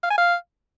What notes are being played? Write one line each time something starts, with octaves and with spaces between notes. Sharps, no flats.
F5
G#5
F5